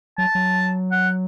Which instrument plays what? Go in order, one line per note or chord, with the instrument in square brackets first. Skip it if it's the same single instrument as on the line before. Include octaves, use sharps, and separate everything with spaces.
[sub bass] F#3 [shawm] A5
[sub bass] F#3
[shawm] F#5